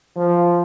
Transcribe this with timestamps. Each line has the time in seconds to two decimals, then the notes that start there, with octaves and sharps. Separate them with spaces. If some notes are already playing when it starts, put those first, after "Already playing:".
0.16 F3